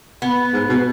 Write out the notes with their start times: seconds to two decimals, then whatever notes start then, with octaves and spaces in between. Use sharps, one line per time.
0.22 B3
0.53 G#2
0.69 B2